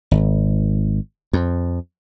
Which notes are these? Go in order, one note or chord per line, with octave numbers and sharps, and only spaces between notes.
G#1
F2